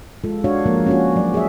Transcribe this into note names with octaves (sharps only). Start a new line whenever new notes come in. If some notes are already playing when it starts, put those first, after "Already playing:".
G#3 F4 A4
D4 F#4 C#5 F5
F3 G#3 A#3 A#4
C#4 F4 F#4
F#3 D5
G#4 E5